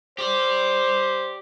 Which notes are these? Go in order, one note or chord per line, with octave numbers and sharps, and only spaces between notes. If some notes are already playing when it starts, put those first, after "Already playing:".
G4 C5 D5